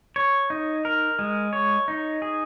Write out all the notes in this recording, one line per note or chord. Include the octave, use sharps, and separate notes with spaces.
C#5
D#4
A#4
G#3
C#5
D#4
G#4